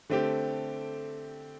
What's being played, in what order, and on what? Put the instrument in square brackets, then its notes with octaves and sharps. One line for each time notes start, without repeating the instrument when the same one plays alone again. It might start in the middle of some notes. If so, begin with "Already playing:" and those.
[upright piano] D3 A3 C4 G4